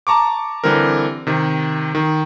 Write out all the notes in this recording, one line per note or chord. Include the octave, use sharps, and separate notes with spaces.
A5 A#5 C#6 D6
D3 E3 G3 C4 A#4
C3 D#3
D#3